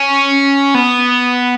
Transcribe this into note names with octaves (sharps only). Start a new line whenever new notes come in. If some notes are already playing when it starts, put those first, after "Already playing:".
Already playing: C#4
B3